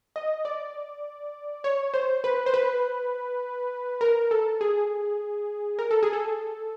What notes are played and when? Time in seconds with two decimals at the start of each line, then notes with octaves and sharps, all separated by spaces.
0.16 D#5
0.45 D5
1.64 C#5
1.94 C5
2.24 B4
2.46 C5
2.54 B4
4.01 A#4
4.31 A4
4.61 G#4
5.79 A#4
5.91 A4
6.03 G#4
6.13 A4